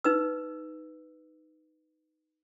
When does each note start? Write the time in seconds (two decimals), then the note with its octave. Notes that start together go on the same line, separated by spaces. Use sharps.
0.04 D#4 B4 E6